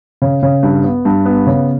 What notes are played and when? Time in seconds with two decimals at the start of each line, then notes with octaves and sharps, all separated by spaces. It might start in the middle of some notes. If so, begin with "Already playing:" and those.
0.22 C#3
0.43 C#3
0.63 G2
0.84 B3
1.05 G2
1.25 B3
1.47 C#3